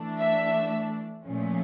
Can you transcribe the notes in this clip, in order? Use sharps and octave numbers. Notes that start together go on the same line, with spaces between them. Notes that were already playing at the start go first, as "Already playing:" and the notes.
Already playing: E3 A3 D4
E5
A#2 F3 A3 C#4